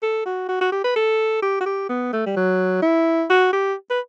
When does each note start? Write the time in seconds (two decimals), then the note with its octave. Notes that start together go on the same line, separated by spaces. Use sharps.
0.03 A4
0.26 F#4
0.49 F#4
0.61 F#4
0.72 G4
0.84 B4
0.96 A4
1.43 G4
1.61 F#4
1.66 G4
1.90 B3
2.13 A3
2.26 G3
2.37 F#3
2.83 E4
3.30 F#4
3.53 G4
3.90 B4